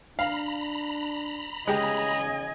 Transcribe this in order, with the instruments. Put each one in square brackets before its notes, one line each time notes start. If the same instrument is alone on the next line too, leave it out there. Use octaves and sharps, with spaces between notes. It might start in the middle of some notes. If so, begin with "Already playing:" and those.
[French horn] D4 [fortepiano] F5 [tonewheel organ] A#5 B5
[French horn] C#3 [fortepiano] G#3 G4 [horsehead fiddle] D#5 G#5